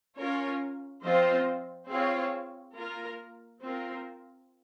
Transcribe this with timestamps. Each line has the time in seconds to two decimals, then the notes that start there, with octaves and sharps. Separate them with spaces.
0.17 C#4 F4 A#4 C#5
1.03 F3 C4 F4 C5 D#5
1.89 C4 F4 G#4 C#5
2.75 A#3 F4 A#4
3.61 C4 F4 A#4